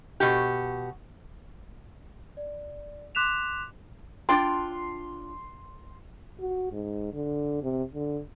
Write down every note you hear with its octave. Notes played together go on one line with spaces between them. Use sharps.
B2 F#4 G4
D5
C6 D6 F#6 B6 E7 F7
D4 F4 G5 C6
F#4
G#2
D3
C3
D3